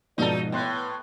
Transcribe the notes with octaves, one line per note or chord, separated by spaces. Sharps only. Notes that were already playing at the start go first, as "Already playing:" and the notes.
G#2 B2 F3 D#4 F#4 A4 D5
A2 B3 G5 C6 F#6